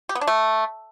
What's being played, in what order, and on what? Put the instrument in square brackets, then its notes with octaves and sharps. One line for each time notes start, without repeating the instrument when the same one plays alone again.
[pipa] G4
B3
D4
A3